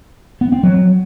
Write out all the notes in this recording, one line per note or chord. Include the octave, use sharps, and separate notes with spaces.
B3
C4
F#3